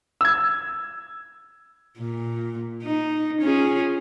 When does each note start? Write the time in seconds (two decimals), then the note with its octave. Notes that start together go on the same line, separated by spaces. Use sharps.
0.21 E6 G#6
1.98 A#2
2.83 D#4
3.41 C#4 F4 G#4